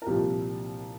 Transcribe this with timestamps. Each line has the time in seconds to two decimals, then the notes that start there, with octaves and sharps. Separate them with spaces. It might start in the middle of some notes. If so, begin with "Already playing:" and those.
0.02 A#4
0.07 C2 A#2 F3 A#3 G4